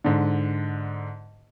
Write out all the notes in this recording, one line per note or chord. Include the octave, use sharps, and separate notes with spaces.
G#2 D3